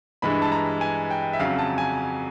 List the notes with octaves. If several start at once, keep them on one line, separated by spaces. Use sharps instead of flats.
G2 E3 G#3 B5
A5
A#5
G#5
G5
E5
F2 C#3 F#3 F5
A5
G#5